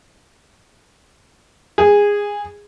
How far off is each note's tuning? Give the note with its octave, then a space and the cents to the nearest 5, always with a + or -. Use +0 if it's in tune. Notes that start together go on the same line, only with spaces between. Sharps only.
G#4 -15